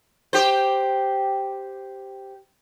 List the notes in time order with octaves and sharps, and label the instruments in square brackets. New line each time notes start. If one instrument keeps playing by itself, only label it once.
[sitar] G4 C5